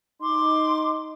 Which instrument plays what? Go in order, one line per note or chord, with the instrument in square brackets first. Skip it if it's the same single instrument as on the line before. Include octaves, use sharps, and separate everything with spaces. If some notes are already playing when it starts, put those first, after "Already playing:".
[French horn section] D#4 [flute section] C6 D6